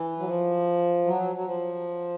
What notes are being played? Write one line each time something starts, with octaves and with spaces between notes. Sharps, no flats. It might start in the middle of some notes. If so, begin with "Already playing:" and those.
Already playing: E3
F#3
F3
F#3
F#3
F3